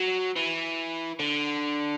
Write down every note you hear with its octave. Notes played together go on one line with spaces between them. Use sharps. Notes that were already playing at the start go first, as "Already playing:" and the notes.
Already playing: F#3
E3
D3